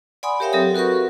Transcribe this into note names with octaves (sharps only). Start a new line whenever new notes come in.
D5 F#5 G#5 B5 C6 D#6
G4 A#4 C#5 E5 F5 G5
F#3 C4 G4 A4 D#6
F#4 A#4 B4 F#5 C#6